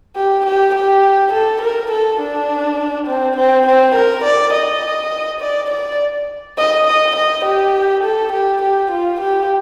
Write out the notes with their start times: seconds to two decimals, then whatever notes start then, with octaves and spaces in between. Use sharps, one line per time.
0.16 G4
0.46 G4
0.75 G4
1.33 A4
1.62 A#4
1.91 A4
2.21 D4
3.07 C4
3.37 C4
3.67 C4
3.95 A#4
4.24 D5
4.53 D#5
5.41 D5
5.70 D5
6.58 D#5
6.87 D#5
7.16 D#5
7.45 G4
8.04 A4
8.33 G4
8.62 G4
8.91 F4
9.20 G4